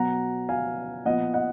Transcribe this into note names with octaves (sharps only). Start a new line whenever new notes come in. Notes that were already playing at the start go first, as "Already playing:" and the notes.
Already playing: B2 F#3 B3 F#5 A#5
F5 G#5
A#2 F3 B3 D#5 F#5
D#5 F#5